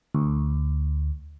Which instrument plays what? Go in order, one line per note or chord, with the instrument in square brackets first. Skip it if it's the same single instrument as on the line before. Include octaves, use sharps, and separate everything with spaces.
[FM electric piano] D2